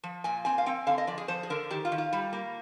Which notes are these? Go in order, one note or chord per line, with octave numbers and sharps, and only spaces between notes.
F3
A#2 G#5
C4 G#5
F5
C4 G5
D3 F5
D#5
F3 D5
G#4
F3 C5
G#4
D3 A#4
D#3 G4
F4
D#3
F4
G3
A#3